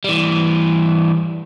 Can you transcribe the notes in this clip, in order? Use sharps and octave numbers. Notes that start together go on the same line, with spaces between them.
E3 G3